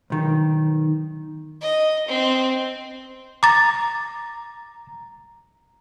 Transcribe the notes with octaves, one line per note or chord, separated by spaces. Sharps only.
B1 D#3
D#5
C4
A#5 D6 A6